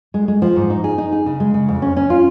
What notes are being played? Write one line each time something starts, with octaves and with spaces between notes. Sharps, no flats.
G#3
G#3
F3
G#2
D#4
G#4
D#4
G#4
C#3
G#3
C#3
F2
C#4
C#4
F4